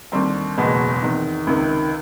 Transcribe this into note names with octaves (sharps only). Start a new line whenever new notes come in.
D#2 D3 G3 C4
F#1 E2 B2 G#3
E2 C3 D#3
C#2 C3 D#3